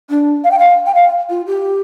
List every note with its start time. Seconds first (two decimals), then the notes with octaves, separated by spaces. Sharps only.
0.10 D4
0.44 F5
0.51 G5
0.59 F5
0.86 G5
0.95 F5
1.30 F4
1.47 G4